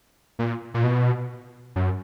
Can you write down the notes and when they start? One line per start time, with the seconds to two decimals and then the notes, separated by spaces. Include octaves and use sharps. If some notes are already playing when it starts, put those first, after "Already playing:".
0.39 A#2
0.74 A#2
0.84 B2
1.76 F#2